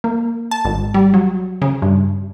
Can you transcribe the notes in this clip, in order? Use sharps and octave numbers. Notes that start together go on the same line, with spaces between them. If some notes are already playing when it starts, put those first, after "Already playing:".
A#3
A5
G#1
G3
F#3
C#3
G2